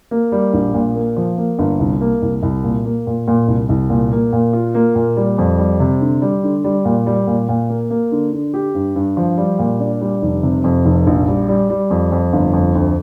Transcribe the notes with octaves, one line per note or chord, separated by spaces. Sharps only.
A#3
G3
A#1
A#2
A#3
F3
A#3
G1
C2
A#3
C2
C2
A#2
A#3
A#2
A#2
C2
C2
A#2
A#3
A#2
F4
A#3
A#2
G3
F2
G3
C3
D3
G3
D3
G3
A#2
G3
A#2
A#2
A#3
A#3
D3
D3
G4
G2
G2
F3
G3
A#2
D4
G3
F1
C3
F2
F1
A#1
G3
G3
G3
F2
F2
G1
F2
D2